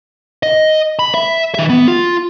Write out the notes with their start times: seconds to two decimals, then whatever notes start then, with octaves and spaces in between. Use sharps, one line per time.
0.43 D#5
0.99 B5
1.14 E5
1.55 D#3 E5
1.69 B3
1.88 F4